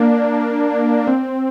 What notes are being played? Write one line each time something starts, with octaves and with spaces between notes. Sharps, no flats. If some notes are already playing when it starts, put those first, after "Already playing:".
Already playing: A#3 D4
C4